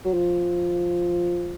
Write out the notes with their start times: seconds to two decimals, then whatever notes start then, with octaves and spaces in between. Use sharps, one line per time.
0.05 F#3
0.13 F3